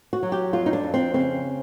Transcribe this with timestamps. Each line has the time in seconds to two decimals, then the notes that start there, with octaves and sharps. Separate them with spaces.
0.13 F#4
0.23 F#3
0.32 G4
0.53 F2 F4
0.66 D#4
0.73 D4
0.83 F2
0.94 C4
1.14 C#3 C4